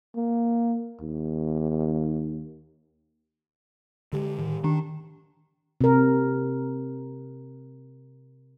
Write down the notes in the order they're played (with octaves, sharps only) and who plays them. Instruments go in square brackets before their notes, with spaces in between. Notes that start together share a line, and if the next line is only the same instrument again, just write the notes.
[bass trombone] A#3
D#2
[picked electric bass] D3 G#3 [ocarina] G4
[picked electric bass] A2 D#3
[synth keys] D#3 [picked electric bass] D4
[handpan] C3 A#4